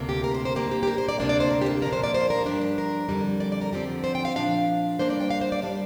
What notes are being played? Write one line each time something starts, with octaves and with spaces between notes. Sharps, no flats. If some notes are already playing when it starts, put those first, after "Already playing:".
Already playing: D2 C3 A#3
G4
A#4
C5
C5
A#2 A#3 D4 G4
G4
G4
A#4
C5
D5
D2 C3 A#3 D4 F5
D5
C5
A#4
G4
F4
A#2 F3 A#3 D4 A#4
C5
D5
C5
A#4
G2 F3 D4 G4
G4
A#4
F2 D3 G3
D5
D5
A#4
F2 D3 F3 C4 G4
C5
G5
F5
A#2 F3 D4 F5
G2 G3 A#3 D4 C5
D5
G5
F5
C5
D5
A#2 G3 D4 F5